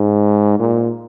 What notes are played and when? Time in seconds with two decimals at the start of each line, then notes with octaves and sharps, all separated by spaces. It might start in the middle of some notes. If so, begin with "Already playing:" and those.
Already playing: G#2
0.59 A#2